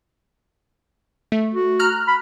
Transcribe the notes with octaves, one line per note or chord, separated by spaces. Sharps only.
A3
F#4
A#5 F6 F#6
B5